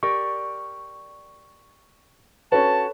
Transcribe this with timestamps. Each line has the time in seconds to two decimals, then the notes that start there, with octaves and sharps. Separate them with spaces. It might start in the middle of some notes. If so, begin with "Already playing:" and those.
0.03 G4 A#4 D5 C#6
2.52 C#4 F#4 A4 B4 C#5 A5